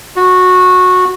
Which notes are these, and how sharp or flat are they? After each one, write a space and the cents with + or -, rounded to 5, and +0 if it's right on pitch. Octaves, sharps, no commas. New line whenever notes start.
F#4 -15